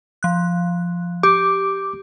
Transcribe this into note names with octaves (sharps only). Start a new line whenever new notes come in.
F3 F#6
G4 D6